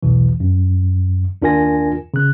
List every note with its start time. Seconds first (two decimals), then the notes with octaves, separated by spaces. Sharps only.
0.03 B1 E2 B2 E3
0.40 F#2
1.42 D#2 D4 F4 A#4 G#5 A#6
2.14 C#3 F#6